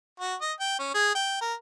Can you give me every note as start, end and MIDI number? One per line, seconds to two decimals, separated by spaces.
0.20 0.35 66
0.41 0.53 75
0.60 0.77 79
0.79 0.93 61
0.94 1.12 68
1.15 1.38 79
1.41 1.54 70